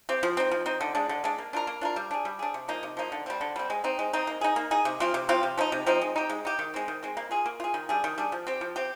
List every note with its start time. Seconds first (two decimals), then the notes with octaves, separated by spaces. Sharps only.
0.09 C4 G4
0.23 F3
0.37 C4 D#4
0.51 F3
0.66 C4 D#4
0.81 D3
0.95 G#3 D4
1.09 D3
1.24 G#3 D4
1.38 A#3
1.53 D4 F4 A#4
1.67 A#3
1.81 D4 F4 A#4
1.96 G3
2.11 D4 G#4
2.25 G3
2.39 D4 G#4
2.54 C3
2.68 F3 A#3 D#4
2.83 C3
2.97 F3 A#3 D#4
3.12 D3
3.26 G3 C4
3.41 D3
3.56 G3 C4
3.70 G#3
3.84 C4 D#4
3.99 G#3
4.13 C4 D#4
4.27 A#3
4.41 D#4 G#4
4.56 A#3
4.71 D#4 G#4
4.85 C3
5.00 F3 C4 F4
5.14 C3
5.29 F3 C4 F4
5.43 C3
5.58 F3 C4 D#4
5.72 C3
5.86 F3 C4 D#4
6.02 G#3
6.16 D#4 G4
6.30 G#3
6.45 D#4 G4
6.59 D#3
6.74 G#3 C4
6.88 D#3
7.03 G#3 C4
7.17 A#3
7.31 F4 G#4
7.46 A#3
7.60 F4 G#4
7.74 D#3
7.89 G3 D4 G#4
8.04 D#3
8.18 G3 D4 G#4
8.32 F3
8.47 C4 G4
8.61 F3
8.76 C4 G4